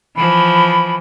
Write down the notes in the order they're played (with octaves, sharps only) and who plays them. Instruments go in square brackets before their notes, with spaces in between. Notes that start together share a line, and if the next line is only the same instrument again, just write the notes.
[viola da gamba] E3 F3 [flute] B5